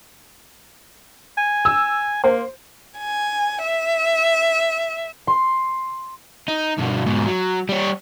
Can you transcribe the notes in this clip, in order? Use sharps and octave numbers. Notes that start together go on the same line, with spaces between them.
G#5
E6
A#3 C5
G#5
E5
C6
D#4
G2 B2
G#2 B2
F#3
G3 C#5